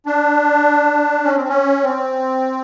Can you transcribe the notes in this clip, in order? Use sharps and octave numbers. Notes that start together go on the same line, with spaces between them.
D4
C#4
C4
C#4
C4